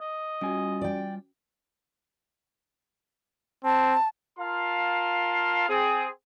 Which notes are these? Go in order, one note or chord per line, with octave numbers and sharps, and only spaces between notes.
D#5
G3 C#4 F4 F#4 G#5
D5 G5
C4 A5
F4 A#4 F5 A5 C6
C4 G#4